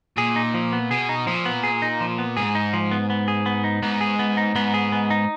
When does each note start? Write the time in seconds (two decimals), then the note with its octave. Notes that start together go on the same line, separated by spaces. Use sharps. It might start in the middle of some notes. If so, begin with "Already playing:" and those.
0.17 A#2 G#4
0.36 D#4
0.54 F3
0.73 B3
0.91 B2 G#4
1.09 D#4
1.27 A#2 F3
1.46 B3
1.64 G#4
1.82 D#4
2.01 F3
2.18 B3
2.37 G#2 G#4
2.55 D#4
2.73 F3
2.91 B3
3.10 B3
3.28 G#4
3.46 B3
3.64 D#4
3.83 G#2 B3
4.01 G#4
4.19 B3
4.37 D#4
4.56 G#2 B3
4.74 G#4
4.92 B3
5.10 D#4